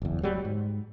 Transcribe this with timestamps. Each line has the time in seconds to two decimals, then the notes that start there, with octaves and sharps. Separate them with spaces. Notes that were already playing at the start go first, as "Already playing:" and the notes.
0.02 F#1 E2
0.22 D1 F#3 G3
0.45 G#2